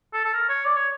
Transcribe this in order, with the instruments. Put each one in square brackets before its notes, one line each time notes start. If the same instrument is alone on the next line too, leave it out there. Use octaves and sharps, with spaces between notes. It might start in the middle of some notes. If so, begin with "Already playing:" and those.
[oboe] A4
A4
A#4
C#5
D5
C#5